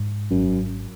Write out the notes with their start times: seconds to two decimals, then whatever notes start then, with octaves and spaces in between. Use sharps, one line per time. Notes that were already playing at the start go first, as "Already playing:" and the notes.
Already playing: G#2
0.31 G#1 F#2